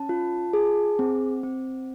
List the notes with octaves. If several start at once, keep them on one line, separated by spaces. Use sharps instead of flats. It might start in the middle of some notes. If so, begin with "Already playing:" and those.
Already playing: C#4 A5
F4
G#4
C4
C4